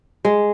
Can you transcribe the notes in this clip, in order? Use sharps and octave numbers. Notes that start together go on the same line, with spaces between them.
G#3